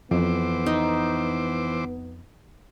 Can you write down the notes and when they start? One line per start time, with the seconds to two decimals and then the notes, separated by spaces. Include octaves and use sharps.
0.11 F2 E3 B3 C5 D6
0.66 D#4